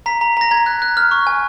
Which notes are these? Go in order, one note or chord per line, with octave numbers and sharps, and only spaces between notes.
A#5 B6
A#5
A#5 A#6
A#5 G#6
F#6
F#6
F6
C#6
G#5